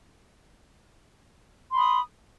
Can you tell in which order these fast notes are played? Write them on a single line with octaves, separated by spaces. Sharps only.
C6 B5 D#6